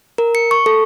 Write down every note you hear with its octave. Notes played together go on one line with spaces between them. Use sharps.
A#4
C#7
C#6
A4